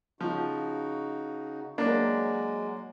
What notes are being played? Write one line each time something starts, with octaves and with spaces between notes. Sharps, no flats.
C#3 F3 D#4 F#4
F#3 G#3 A#3 D4